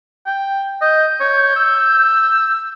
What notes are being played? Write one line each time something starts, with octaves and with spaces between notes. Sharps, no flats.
G5
D#5 G6
C#5
E6